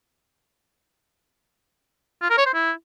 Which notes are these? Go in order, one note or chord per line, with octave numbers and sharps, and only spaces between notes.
F4
A#4
C#5
C5
E4